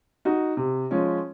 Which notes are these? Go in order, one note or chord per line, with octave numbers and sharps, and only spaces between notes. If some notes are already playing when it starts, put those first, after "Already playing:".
D#4 F#4
C3
F3 G#3 C#4